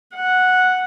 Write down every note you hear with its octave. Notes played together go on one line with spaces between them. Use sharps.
F#5